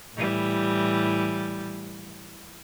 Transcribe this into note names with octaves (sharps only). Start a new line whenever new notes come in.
A2 E3 G3